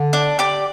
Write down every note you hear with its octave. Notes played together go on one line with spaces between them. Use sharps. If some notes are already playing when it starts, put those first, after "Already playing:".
Already playing: D3
D4
G4 D5